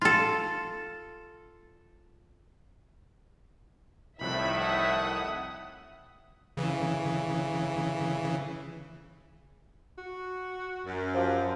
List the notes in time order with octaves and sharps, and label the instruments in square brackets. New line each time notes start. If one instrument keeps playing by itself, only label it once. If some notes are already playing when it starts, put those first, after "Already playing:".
[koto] F4 A4
[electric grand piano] C2 F3 F#6 [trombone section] A2 D#3 [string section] E5 [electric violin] B5
[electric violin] F#5 D#6
[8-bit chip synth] C#3 E3
[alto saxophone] F#4
[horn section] F#2
[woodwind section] F3 [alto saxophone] G4